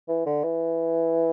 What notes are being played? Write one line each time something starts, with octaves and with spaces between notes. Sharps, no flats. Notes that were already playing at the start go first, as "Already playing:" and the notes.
E3
D3
E3